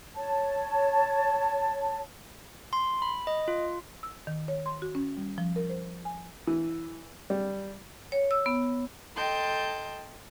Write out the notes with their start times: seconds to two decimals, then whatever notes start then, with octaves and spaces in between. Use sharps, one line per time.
0.16 C#5 A5
2.73 C6
3.02 B5
3.27 D#5
3.48 F4
4.03 E6
4.27 D#3
4.48 C#5
4.66 C6
4.82 F#4
4.95 C#4
5.17 G3
5.38 F3
5.56 A#4
5.70 C5
6.05 G#5
6.47 E3
7.30 G3
8.12 C#5
8.31 E6
8.46 B3
9.15 A4 D#5 G5 A5 C6 G6